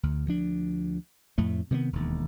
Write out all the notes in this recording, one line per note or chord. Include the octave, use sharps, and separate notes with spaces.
D2
D2 F3 D4
F2 A2 A3
C3 D#3 G#3 B3
E1 D#2